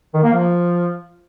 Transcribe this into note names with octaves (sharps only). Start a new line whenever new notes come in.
D#3
A#3
F3